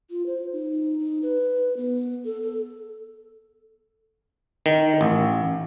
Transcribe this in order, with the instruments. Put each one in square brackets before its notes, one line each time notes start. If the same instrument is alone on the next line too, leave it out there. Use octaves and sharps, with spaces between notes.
[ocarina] F4
C5
D#4
D#4
B4
B3
A4
A4
[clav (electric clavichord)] D#3
A1